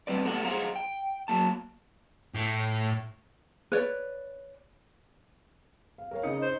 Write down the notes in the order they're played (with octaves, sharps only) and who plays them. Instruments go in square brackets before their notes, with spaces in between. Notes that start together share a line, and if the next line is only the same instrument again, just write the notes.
[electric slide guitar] G3 C4 B4 D5
A3 B3 G4 A4 F#5
G#4 C5 D#5 F5 F#5 A#5
G5
F#3 A#3 A5
[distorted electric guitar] A2
[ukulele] B4 C#5 D5
[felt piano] F5
A#4 C#5 F5
[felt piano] C#3 D#6 C#7 [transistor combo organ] D#4
[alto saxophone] C5